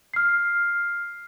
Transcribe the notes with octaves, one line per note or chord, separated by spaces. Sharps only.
F6 C7